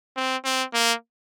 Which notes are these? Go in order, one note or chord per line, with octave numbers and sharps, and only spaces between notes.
C4
C4
A#3